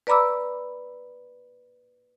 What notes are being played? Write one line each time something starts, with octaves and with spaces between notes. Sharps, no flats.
B4 D5 A#5 B5 D6 E6